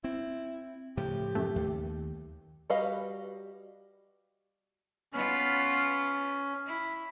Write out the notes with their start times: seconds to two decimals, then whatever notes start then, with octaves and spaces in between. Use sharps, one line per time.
0.04 C4 E4
0.97 A2 C#3 F3 G4
1.35 F#2 A3
1.56 D#2
2.70 G3 F#4 B4 D#5 F5
5.13 B3 C#4 F4
6.66 E4